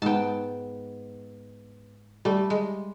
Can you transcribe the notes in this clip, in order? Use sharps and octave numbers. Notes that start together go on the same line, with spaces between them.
G#2 B3 G5 A5
G3 A3
G#3